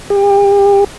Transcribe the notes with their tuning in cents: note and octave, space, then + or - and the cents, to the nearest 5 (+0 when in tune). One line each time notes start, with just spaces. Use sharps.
G4 +35